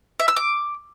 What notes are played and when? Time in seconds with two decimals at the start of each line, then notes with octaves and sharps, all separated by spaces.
0.19 E5
0.28 E6
0.36 D6